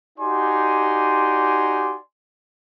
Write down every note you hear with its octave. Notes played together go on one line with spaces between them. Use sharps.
D#4 F#4 G4 D5 G#5 C6